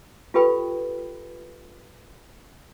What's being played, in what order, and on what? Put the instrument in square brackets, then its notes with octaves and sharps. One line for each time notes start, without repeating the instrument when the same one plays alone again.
[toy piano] F4 G4 A4 B4 G5 B5